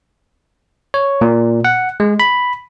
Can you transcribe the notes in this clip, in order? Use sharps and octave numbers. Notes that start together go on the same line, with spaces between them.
C#5
A#2
F#5
G#3
B5